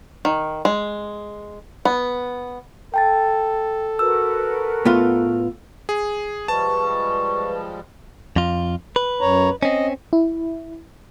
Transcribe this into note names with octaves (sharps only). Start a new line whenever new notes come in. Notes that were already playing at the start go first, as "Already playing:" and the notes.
D#3
G#3
B3
A4 G5 A5 A6
F#4 A#4 B4 E6
A2 B3 F4
G#4
F3 G3 G#3 B4 A5 C#6
F2 F4
B4
F#2 C#5 A#5
C4 C#4 D#5
E4